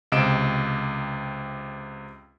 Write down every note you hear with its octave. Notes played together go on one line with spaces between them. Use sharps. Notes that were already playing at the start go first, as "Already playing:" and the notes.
C#2 C3 D#5 D7 E7